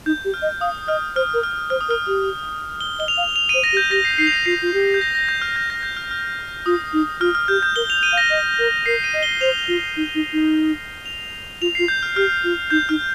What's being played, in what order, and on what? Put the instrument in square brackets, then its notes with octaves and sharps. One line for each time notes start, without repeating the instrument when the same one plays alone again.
[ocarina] D#4 [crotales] G6
[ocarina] G4
[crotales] F6
[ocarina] D#5
[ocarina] F5 [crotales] D#6
[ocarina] D#5 [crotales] F6
[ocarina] C5 [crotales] F6
[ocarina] A#4
[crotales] F6
[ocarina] C5 [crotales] F6
[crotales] D#6
[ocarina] A#4 [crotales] F6
[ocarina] G4
[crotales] G7
[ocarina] D#5 [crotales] G7
[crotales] F7
[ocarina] F5
[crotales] F7
D#7
[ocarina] C5
[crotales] A#6
[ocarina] G4
[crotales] G6
[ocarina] G4 [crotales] A#6
[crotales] C7
[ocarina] D#4 [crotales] C7
[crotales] F7
D#7
[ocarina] F4 [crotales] C7
[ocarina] F4
G4
[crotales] G6
A#6
A#6
G6
F6
G6
A#6
G6
F6
F6
[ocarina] F4 [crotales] D#6
[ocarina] D#4
[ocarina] F4 [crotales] F6
[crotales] F6
[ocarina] G4 [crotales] G6
[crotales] G6
[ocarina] A#4 [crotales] G7
[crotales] F7
D#7
[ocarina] F5
[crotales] A#6
[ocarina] D#5
A#4
[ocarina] A#4 [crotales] C7
[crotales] D#7
[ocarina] D#5
[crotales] G7
[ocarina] C5 [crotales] F7
[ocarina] F4
D#4
D#4
D#4
[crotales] F7
[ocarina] F4 [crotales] F7
[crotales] C7
[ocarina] F4
[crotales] G6
F6
[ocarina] G4 [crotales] F6
[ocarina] F4
[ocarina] D#4 [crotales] G6
[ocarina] D#4 [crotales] F6